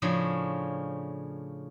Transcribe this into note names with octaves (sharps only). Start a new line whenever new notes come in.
A2 C#3 F3 C#4 D4